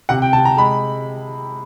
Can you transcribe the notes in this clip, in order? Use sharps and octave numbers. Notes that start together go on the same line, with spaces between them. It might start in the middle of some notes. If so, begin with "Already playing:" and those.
C3 F#5
G5
C3 A5
A#5
G#3 B5